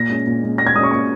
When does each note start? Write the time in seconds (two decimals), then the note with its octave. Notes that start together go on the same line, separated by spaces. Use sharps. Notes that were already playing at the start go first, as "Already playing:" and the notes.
Already playing: A#2 A#6
0.09 G#3 C#4
0.27 A#2
0.43 G#3 C#4
0.58 A#2 A#6
0.67 G#6
0.75 G#3 D#6
0.80 C#4 C#6
0.91 A#2 C#6